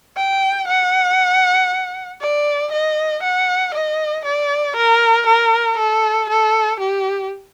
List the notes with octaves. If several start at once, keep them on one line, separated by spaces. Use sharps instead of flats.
G5
F#5
D5
D#5
F#5
D#5
D5
A#4
A#4
A4
A4
G4